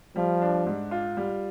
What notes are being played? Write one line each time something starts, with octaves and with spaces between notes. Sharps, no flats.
F3 G3
D4
G#2
F4
G3